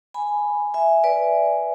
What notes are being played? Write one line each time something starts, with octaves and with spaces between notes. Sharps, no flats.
G#5 B5
E5 G#5
B4 D5